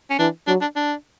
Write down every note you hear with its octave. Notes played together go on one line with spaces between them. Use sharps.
C#4
E3 D4
F#3 D4
D4
D4